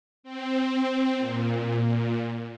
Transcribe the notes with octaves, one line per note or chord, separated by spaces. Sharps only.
C4
A#2